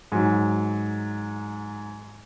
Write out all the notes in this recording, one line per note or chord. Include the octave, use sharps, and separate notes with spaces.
G#2 F#3